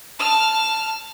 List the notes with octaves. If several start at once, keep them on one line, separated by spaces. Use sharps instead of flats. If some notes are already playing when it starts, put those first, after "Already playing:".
A5 F6